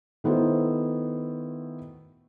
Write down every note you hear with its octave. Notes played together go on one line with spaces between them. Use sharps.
D#3 A3 B3 E4 F#4 C5